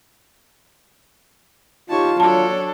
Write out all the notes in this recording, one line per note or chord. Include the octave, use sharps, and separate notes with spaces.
D#4 F4 G4 C#5 A5
F#3 D4 A4 C#5 A5